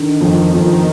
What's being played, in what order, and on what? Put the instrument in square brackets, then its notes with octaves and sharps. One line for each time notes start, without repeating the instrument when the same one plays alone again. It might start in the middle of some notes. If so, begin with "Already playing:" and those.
Already playing: [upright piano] D3 [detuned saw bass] D#3
[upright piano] F2
F2